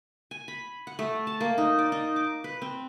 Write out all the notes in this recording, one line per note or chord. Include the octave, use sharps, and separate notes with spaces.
G#5
B5
F#5
A3
A5
A#3
D#4
D5
D#4
D6
B4
C4